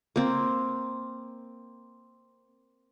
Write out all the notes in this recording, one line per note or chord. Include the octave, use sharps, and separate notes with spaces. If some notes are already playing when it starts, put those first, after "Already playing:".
A#3 C4